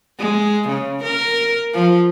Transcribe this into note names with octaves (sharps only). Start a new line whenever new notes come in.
G#3
C#3
A#4
F3